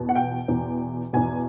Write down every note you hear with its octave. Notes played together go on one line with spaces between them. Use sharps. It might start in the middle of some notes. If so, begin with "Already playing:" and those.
Already playing: E2 B2
F#5
G5
E2 B2
E2 B2 G#5